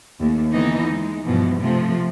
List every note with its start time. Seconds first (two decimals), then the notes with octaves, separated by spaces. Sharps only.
0.19 D#2 A3
0.53 D3 E3 B3 D#4
0.91 G#3
1.25 G2 B2 E3 F3
1.60 C3 F3 A3